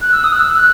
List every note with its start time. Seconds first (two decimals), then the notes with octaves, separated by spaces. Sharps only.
0.02 F#6
0.13 E6
0.24 D#6
0.33 F#6
0.39 E6
0.56 F#6